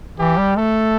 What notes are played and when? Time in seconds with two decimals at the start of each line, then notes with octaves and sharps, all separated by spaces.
0.18 E3 G4
0.37 G3
0.57 A3 A4